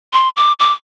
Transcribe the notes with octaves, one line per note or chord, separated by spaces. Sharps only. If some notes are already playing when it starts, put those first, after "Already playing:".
C6
D6
D6